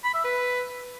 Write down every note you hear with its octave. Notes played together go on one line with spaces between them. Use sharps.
B5
E5
B4